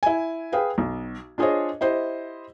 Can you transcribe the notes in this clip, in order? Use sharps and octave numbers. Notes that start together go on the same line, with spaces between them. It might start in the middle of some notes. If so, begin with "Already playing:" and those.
E4 G#5
G#4 B4 F5 G5
B1
D4 F4 G#4 C5 C#5 D#5
E4 G4 C5 D#5